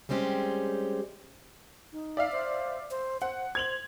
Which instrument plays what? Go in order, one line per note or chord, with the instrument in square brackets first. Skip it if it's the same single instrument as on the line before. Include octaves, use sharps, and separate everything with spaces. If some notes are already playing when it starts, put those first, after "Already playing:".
[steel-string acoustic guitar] G3 G#3 C4 C#4 G4
[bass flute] D#4
[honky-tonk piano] D5 E5 F5
[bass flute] C5
C5
[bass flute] C5 [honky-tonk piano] F#5
[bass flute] C5 [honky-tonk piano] G#6 F7 F#7